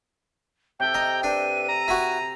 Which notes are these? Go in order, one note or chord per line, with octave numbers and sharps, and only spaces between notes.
C3 A4 G5
D#5 A#5
D4 B4 D#7
A#5
E4 F#4